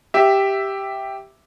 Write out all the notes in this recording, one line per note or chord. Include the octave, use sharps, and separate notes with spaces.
G4 E5